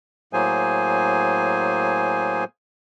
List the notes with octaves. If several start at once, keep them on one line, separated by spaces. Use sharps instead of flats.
A2 F#3 A#3 G#4 C5 G#5